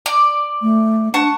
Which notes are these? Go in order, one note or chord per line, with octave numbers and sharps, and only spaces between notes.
D5
A3
D4 F#5 A5 C#6